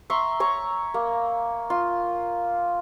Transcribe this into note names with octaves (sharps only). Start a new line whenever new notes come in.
E5 A#5 C6 C#6
C#5 A#5 C#6
A#3
F4